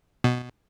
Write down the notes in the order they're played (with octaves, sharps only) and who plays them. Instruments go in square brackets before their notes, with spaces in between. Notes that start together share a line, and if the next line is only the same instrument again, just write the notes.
[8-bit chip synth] B2